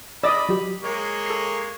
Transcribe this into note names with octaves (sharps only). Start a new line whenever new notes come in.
D5 D#5 B5 E6 A6 A#6
F#3 G4
G#3 A#3 C#5
A4 C7